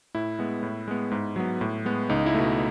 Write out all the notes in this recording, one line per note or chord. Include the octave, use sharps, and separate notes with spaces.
A2 E4
G#3 B3
A2
G#3 B3
G#2
F#3 B3
A2
G#3 B3
C#2 D#4
E4
B2 A3